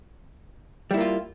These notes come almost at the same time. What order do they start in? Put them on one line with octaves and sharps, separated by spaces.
G3 E4 A#3 F4